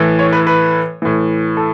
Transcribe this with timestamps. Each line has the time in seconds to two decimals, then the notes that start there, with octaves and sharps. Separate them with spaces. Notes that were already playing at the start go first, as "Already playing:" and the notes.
Already playing: A2 E3
0.19 C#5
0.33 B4
0.47 B4
1.02 A2 E3
1.57 A4